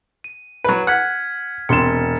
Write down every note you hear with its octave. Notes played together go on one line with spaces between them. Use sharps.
D#7
F#3 B4
F#5 F6 G#6 B6
E1 C3 C6 A6 C#7 E7